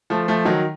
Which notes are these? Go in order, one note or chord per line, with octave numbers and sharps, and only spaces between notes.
F3 A3
F3 A3
D#3 F#3